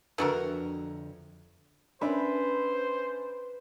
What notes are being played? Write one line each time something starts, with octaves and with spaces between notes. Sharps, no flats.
F2 D3 A3 D4 F#4 A#4 B4
C#4 D4 B4 C5 E5